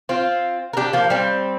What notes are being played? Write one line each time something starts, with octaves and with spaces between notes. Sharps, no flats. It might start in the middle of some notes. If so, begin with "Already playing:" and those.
C4 F4
A#4
D4 G4
F3 A#3
G3 C4